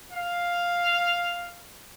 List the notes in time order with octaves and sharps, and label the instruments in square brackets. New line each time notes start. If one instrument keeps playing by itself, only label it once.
[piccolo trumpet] F5